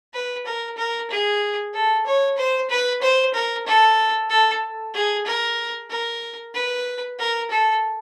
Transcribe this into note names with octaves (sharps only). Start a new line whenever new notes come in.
B4
A#4
A#4
G#4
A4
C#5
C5
B4
C5
A#4
A4
A4
G#4
A#4
A#4
B4
A#4
A4